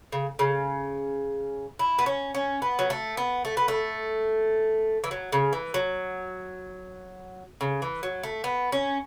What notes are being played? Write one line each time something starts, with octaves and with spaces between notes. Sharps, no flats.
C#3
C#3
E4
B3
C#4
C#4
B3
F#3
A3
B3
A3
B3
A3
E3
F#3
C#3
E3
F#3
C#3
E3
F#3
A3
B3
C#4